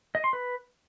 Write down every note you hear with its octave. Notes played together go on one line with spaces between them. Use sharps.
D#5
C6
B4